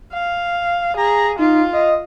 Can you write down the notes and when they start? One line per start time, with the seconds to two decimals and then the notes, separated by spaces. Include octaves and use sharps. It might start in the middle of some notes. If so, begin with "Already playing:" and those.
0.13 F5
0.97 G#4 A#5
1.39 D#4 F4
1.73 D#5